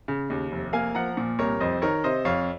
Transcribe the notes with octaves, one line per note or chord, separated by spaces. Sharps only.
C#3
D#2
F1
A#3 F5 G#5
F3 F#5 A#5
A#2
C2 A#4 C#5
F2 C5 D#5
D#3 A#4 C#5
C3 C5 D#5
F2 C#5 F5